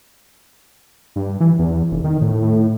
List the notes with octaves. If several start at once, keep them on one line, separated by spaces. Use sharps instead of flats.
G2
E3
E2
F1
D#3
A2
A2